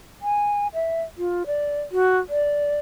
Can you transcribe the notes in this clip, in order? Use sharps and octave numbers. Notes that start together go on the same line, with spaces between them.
G#5
E5
F4
D5
F#4
D5